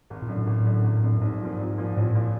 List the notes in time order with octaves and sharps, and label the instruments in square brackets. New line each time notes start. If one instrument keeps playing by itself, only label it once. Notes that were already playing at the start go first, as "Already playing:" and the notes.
[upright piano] G#1
[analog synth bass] A#2
[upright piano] F#2 D3
[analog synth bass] A2
[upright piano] G#1
F#2 D3
G#1
F#2 D3
[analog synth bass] G2
[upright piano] C2 [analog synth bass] G#2
[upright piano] A#2 F3
C2
A#2 F3
[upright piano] C2 [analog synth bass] A2
[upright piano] A#2 F3